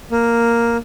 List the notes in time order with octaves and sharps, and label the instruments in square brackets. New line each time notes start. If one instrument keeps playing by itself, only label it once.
[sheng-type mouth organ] A#3